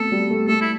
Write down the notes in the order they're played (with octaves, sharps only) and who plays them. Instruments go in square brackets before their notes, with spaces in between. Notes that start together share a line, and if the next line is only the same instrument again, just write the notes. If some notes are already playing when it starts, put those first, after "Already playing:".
Already playing: [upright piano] A3 B3 C4 [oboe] A4
[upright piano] G3
A3
[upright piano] A3 [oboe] A4
[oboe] E4